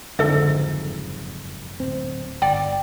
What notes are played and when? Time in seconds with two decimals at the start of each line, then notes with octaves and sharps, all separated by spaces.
0.19 F#1 F2 G#2 D3 A4 E5
1.80 D1 C4
2.42 G1 D5 G5